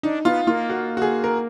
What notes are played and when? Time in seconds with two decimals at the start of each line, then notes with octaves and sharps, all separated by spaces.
0.03 D4 D#4
0.25 B3 F4
0.47 A#3 F4
0.70 F#4
0.97 F#4
1.02 G#4
1.24 A#4